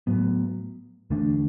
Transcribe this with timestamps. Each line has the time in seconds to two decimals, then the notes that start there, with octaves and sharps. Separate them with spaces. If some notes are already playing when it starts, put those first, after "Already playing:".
0.07 A2 F#3 B3
1.10 E2 D3 A3 D4